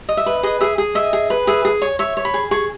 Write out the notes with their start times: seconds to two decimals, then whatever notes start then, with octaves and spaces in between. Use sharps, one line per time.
0.09 D#5
0.17 E5
0.26 B4
0.43 G#4 D#5
0.61 G#4 E5
0.78 G#4
0.95 D#5 E5
1.13 G#4
1.30 B4
1.47 G#4 E5
1.65 G#4
1.82 C#5
1.99 C#5 E5
2.17 C#5
2.25 B5
2.34 G#4
2.51 G#4 C#6